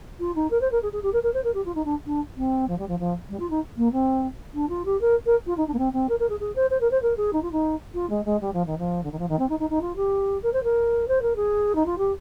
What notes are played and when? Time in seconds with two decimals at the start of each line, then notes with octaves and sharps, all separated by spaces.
0.20 F4
0.35 D#4
0.51 A#4
0.61 C5
0.71 A#4
0.82 G#4
0.92 G#4
1.03 G4
1.13 A#4
1.23 A#4
1.34 C5
1.44 A#4
1.54 G4
1.65 F4
1.75 D#4
1.85 D4
2.06 D4
2.37 C4
2.68 F3
2.78 G3
2.88 F3
2.99 F3
3.29 G3
3.39 F4
3.50 D#4
3.77 A#3
3.92 C4
4.54 D4
4.69 F4
4.85 G4
5.01 A#4
5.26 A#4
5.46 F4
5.57 D#4
5.67 D4
5.73 A#3
5.78 C4
5.93 C4
6.09 A#4
6.19 A#4
6.29 G#4
6.40 G#4
6.55 C5
6.70 C5
6.80 A#4
6.91 C5
7.02 A#4
7.17 G#4
7.33 D#4
7.42 F4
7.52 D#4
7.94 F4
8.10 G#3
8.25 G#3
8.41 G3
8.53 F3
8.66 D#3
8.78 F3
9.03 D3
9.12 D#3
9.19 F3
9.29 D#3
9.39 C4
9.49 D#4
9.59 D#4
9.70 D#4
9.81 F4
9.96 G4
10.43 A#4
10.53 C5
10.63 A#4
11.08 C5
11.22 A#4
11.36 G#4
11.75 D#4
11.86 F4
11.98 G4